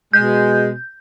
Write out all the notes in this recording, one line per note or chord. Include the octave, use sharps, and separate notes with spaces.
B2 G#3 G6